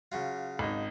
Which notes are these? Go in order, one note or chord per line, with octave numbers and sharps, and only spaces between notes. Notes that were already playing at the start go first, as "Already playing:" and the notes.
C#3 F#3 F4
G#1 D#4